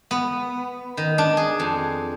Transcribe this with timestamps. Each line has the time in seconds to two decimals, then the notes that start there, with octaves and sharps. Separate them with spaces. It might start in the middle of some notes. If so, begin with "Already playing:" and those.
0.11 B3
0.97 D#3
1.18 D4
1.37 G#4
1.60 F2